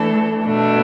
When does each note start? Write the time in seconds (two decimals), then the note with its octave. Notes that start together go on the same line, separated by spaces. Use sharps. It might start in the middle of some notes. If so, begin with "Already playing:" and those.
Already playing: E3 A3 D4 A4
0.45 B2 A3 D4